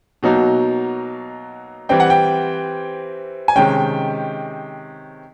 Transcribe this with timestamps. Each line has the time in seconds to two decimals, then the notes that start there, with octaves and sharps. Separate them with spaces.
0.23 B2 F#3 A#3 D#4
1.89 E3 G3 C4 G5
2.00 F#5
2.10 G5
3.48 G#5
3.55 C3 D#3 G#3 C#4 G5